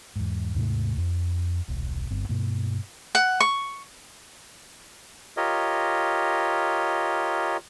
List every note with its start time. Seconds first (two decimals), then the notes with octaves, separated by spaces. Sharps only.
0.16 E2 G#2
0.54 D#2 G#2 C3 A3
0.97 F2
1.68 D#1 B1
2.11 G1 G2 C4
2.29 G2 B2 A#3
3.15 F#5
3.40 C#6
5.37 F4 G4 A#4 C#5 D#5